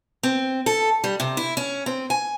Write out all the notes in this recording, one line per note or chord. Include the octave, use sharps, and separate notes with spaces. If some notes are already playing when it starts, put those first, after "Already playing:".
C4
A4
G3
C3
E4
C#4
C4
G#5